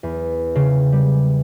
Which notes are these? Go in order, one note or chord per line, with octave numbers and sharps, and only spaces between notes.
E2
C#3
G3